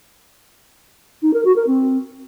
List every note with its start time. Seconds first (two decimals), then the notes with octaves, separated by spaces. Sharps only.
1.22 D#4
1.34 A#4
1.45 F#4
1.56 A#4
1.67 C4